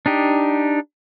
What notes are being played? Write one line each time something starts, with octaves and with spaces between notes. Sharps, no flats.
D4 D#4 G4